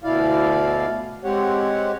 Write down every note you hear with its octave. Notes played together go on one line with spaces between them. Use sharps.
D2 B2 E4 D5 F5
G#3 C4 G4 C#5 F#5